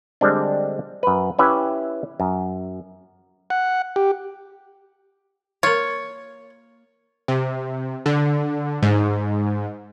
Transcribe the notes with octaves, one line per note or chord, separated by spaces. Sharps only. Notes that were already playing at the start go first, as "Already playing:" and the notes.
D3 G3 G#3 C4 D4
F#2 B4
C#4 E4 G4 B4 E5
F#2
F#5
G4
A#3 F4 C#5
C3
D3
G#2